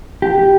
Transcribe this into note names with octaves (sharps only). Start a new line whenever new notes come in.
G4